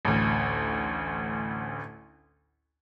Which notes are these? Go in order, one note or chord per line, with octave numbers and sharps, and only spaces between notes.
A1 D2